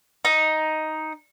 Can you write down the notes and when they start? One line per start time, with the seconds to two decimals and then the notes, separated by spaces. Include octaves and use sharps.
0.25 D#4